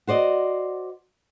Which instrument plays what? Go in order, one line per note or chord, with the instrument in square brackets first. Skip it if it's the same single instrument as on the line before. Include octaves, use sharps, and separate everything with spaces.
[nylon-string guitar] F#4 C5 D5 D#5